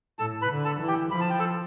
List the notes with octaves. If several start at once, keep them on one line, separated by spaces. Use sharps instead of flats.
A2 A4 A5
B4 B5
D3
A4 A5
E3
G4 G5
F3 B5
A5
G5
A4 A5